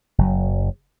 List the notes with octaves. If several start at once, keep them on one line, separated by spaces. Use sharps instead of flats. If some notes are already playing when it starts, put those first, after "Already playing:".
F#1 F#3